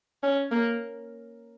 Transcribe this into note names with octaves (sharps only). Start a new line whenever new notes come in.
C#4
A#3